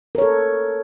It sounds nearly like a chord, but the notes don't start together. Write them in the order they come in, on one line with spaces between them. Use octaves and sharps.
A#4 C#5 A4